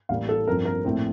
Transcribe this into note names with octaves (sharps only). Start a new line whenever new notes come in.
A1 A2 G3 A#3 F5
A4
G2 F3 C4 A#4
A#4
A#1 A2 A3 C4